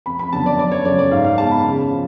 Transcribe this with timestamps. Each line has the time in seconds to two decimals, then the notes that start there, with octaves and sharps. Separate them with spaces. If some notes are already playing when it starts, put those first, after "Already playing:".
0.06 F2 B5
0.19 B5
0.32 D3 F#3 B3 A5
0.46 D5
0.59 F#2 D5
0.72 C#5
0.85 C#3 F#3 A3 D5
0.99 D5
1.11 G#2 F5
1.25 F5
1.38 G#3 B3 A5
1.51 B5
1.64 C#3
1.90 F3